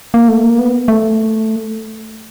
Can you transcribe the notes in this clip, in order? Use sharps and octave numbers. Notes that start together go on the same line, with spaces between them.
A#3
A3
A#3
B3
A3